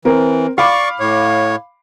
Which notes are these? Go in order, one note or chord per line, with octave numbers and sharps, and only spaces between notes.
E3 C4 A#4
D5 F5 B5 C#6 D6
A2 C#5